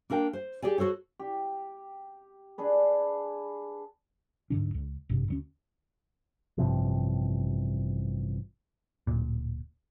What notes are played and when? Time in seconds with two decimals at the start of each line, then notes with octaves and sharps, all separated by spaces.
0.10 A#3 D4 A#4 G5
0.33 C5
0.62 G4 G#4 D5 G#5
0.78 F#4 A4 C5 C#5
1.19 G4
2.58 D4 G#4 B4
4.50 D1 G#2 D3 D4
4.74 C#2
5.09 G#1 G2 C3
5.28 D2 F#3 C#4
6.58 A1 G2 C3 F3
9.07 D1 A#2